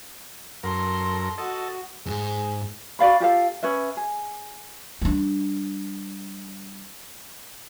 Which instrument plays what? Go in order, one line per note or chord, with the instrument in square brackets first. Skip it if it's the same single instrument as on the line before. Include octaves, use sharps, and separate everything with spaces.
[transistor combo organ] F#2 A#4 [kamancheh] A4 C6
[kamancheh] F#4 [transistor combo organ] A4 D#5
[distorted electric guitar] E2 G#2 [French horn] G#4
[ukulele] F#4 D5 F5 B5
F4 G4 A4 F5
C#4 B4 E5
G#4
[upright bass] G3 D4